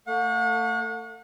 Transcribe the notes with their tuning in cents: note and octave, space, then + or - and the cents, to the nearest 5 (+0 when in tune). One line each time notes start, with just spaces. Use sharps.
A3 +30 F#5 -40